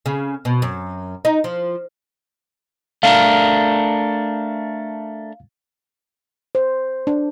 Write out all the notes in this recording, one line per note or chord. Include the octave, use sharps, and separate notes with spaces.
C#3
B2
F#2
D#4
F3
A3 D4 A#4 F5
C5
D4